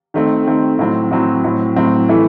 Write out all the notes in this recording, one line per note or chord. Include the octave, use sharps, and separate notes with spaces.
D#3 A3 C4
D#3 A3 C4
A2 F#3 C4
A2 F#3 C4
A2 F#3 C4
A2 F#3 C4
E3 A3 E4